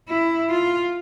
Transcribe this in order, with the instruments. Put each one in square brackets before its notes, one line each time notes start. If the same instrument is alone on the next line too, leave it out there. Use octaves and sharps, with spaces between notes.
[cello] E4
F4